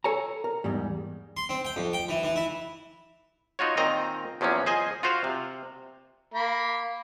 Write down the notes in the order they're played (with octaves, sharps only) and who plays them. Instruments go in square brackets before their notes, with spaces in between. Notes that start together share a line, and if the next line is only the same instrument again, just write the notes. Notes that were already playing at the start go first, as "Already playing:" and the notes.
[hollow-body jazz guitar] A4 C#5 G#5 A#5
A#4
E2 G#2 G3
[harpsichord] C6
C4
G5
F2
G5
E3
E3
E4
[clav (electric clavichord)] D#4 F4 F#4 C#5
A#2 D#3 C4 D#5 A#5
E2 F3 F#3 A#3 C#4
G#4 C5 D#5 G#5
F4 F#4 C5 F5
C3
[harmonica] A#3 B5